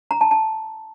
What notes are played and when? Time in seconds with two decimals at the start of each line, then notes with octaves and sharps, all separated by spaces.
0.11 A#5
0.21 A5
0.31 A5